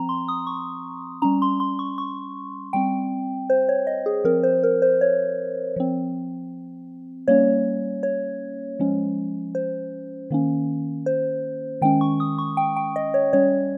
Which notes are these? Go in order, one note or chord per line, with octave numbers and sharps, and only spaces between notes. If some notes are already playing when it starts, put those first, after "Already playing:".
Already playing: F3 C4 A#5
C6
D#6
C#6
G3 C#4 A#5
C6
C6
C#6
C#6
G3 C4 G5
C5
C#5
D#5
G#4
F3 C4 A#4
C5
A#4
C5
C#5
F3 C4
G3 A#3 C#4 C#5
C#5
F3 G#3 C#4
C5
D#3 A#3 C#4
C5
D#3 G#3 C#4 G5
C#6
D#6
C#6
G5
G5
D#5
C#5
G3 C#4 C#5